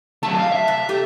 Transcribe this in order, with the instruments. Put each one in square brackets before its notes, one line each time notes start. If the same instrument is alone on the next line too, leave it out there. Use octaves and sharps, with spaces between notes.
[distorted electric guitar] F#3 A3 [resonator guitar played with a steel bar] A5
[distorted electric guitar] F5
E5
[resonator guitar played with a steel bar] C3
A3 G4